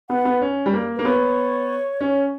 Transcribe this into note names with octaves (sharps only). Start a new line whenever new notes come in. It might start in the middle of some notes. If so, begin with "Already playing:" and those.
B3 F#5
B3
C#4
G3
A#3
A#3 B4
B3 C#5
C#4